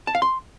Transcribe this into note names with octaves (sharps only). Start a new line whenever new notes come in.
A5
F5
C6